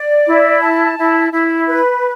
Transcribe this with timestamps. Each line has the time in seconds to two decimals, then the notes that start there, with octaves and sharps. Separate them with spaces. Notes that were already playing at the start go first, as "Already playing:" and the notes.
Already playing: D5
0.27 E4
0.62 A5
0.97 E4
1.32 E4
1.67 B4